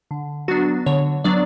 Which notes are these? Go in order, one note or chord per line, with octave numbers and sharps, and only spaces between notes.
D3
F#3 B3 D4 F#4
D3 C#5
F#3 B3 D4 D5